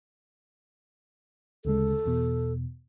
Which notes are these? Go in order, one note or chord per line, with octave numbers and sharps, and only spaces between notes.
D2 C#3 G#3 A4
E2 B2